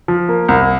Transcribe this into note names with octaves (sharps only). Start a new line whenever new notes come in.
F3
A#3
C2